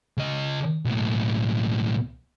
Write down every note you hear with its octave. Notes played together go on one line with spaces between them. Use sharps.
C#3 D#5
B1 A2